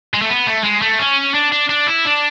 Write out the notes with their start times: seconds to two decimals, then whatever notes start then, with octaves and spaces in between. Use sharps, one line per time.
0.14 G#3
0.22 A3
0.29 B3
0.47 A3
0.64 G#3
0.82 A3
0.99 C#4
1.34 D4
1.52 D4
1.70 D4
1.87 E4
2.05 D4